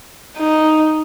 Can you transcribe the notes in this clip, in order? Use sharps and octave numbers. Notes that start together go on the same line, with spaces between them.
D#4